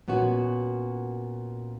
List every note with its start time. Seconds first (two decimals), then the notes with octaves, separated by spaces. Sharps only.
0.08 A#2 B3 C#4 F#4